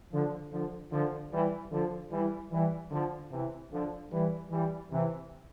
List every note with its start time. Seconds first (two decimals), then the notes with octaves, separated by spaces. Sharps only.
0.12 D3 F3
0.52 D3 F3
0.92 D3 F3
1.32 E3 G3
1.72 D3 F3
2.12 E3 G3
2.52 E3 G3
2.92 D3 F3
3.31 C3 E3
3.71 D3 F3
4.11 E3 G3
4.51 E3 G3
4.91 C3 E3